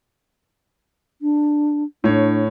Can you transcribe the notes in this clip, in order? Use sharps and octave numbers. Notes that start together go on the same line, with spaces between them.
D4
A2 D4 C#5